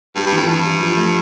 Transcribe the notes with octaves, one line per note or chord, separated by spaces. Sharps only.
G2 G3
G2
F2 E3
G2 E3
G3
F3
A3